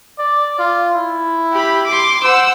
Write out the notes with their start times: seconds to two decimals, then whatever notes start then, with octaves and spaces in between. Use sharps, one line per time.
0.19 D5
0.59 F4
0.96 E4
1.52 G4 B5
1.86 C6 D6
2.23 C5 F#5 E6